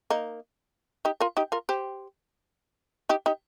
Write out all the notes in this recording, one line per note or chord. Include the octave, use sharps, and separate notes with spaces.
A#3 D#4
D#4 G4
F4 A#4
D#4 G4
F4 A#4
G4 C5
D#4 G4
D#4 G4